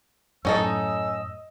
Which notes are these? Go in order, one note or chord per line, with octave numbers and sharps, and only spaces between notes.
F#2 A2 C#4 D#4 A4 D#5 E6